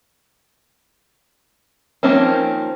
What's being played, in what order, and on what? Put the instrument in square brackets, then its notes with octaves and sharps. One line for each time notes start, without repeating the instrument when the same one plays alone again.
[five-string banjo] D#3 F3 A#3 C4 C#4